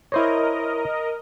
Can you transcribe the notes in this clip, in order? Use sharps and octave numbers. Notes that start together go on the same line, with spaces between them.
E4 A#4 C5 C#5 D#5